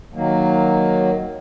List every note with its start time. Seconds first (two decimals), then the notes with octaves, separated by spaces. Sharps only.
0.14 D#3 F#3 A#3